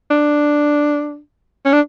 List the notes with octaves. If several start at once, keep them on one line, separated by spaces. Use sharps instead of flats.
D4
C#4
D4